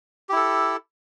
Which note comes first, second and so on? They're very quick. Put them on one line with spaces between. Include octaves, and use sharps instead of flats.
G4 E4 A4